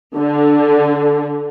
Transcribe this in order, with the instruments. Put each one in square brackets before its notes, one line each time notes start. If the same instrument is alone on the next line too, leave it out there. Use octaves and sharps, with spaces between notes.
[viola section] D3